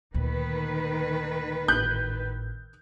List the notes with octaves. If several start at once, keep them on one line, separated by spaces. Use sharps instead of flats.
D2 A#2 D#3 B4
G#1 A2 F#6 G6